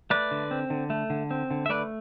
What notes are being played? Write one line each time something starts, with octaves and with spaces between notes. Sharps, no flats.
A3 B4 D5
D3
C4
D3
A3
D3
C4
D3
E5
A3 B4 D5